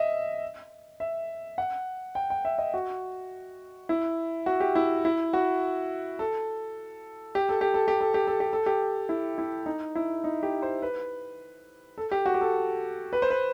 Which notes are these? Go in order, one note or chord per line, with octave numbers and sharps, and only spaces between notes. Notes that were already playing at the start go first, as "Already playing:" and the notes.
Already playing: D#5 E5
E5
F#5
G5
G5
E5
D#5
F#4
E4
F#4
G4
E4
E4
F#4
A4
G4
A4
G4
A4
G4
A4
G4
A4
G4
A4
G4
E4
E4
D#4
E4
D#4
G4
C5
B4
A4
G4
F#4
G4
A4
B4
C5
B4